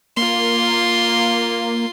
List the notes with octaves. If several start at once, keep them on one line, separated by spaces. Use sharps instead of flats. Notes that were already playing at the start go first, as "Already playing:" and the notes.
A#3 F4 C6